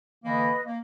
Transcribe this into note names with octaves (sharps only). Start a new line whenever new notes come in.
D3 E3 A#3 B4 D#5
A#3